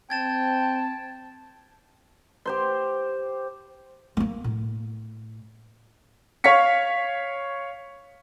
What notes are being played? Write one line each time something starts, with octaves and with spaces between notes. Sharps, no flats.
C4 G5 A5 G#6 A6 E7
G4 C5 C6
A3 A#3
A2
C#5 F5 C#6 B6 C#7